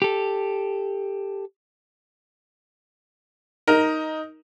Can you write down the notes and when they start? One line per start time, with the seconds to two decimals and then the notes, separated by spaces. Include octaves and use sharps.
0.02 G4 A4
3.67 D#4 A#4